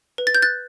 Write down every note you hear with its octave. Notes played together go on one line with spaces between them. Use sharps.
B4
A6
G6
F#6 A6